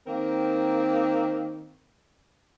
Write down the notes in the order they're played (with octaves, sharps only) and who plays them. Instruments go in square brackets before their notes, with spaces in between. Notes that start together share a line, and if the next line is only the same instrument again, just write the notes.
[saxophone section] D#3 A#3 C4 A#4